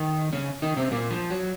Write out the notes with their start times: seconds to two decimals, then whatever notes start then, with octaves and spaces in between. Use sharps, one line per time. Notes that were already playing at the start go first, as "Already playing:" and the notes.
Already playing: D#3 D#4
0.33 C#3 C#4
0.62 D#3 D#4
0.77 C3 C4
0.91 A#2 A#3
1.11 F3
1.30 F#3